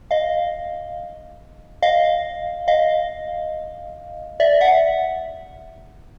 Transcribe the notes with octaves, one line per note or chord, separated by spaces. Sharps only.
D#5 F5
D#5 F5
D#5 F5
D5 E5
E5 F#5